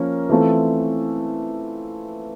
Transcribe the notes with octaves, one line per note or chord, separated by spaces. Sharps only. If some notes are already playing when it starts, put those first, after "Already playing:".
Already playing: F3 A#3 C#4 A#4
E3 A3 C4 F4 A4